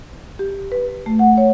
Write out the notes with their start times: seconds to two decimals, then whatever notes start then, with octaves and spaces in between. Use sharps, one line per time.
0.39 G4
0.72 B4
1.06 A3
1.19 F#5
1.37 C#5